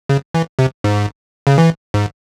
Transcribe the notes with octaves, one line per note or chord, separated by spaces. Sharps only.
C#3
E3
C3
G#2
C#3
E3
G#2